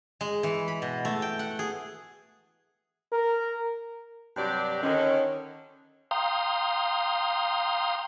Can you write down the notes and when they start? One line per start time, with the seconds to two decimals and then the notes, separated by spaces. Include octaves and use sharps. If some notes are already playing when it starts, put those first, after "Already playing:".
0.21 G#3
0.43 E3
0.68 B5
0.82 B2
1.05 A3
1.22 G5
1.39 F#5
1.59 G#4
3.12 A#4
4.37 G2 C3 F#3 D4 G4 D5
4.83 D3 D#3 C#4
6.11 F5 G5 A#5 C6 D#6